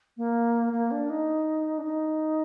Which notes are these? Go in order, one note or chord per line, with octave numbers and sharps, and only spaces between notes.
A#3
A#3
D4
D#4
D4
D#4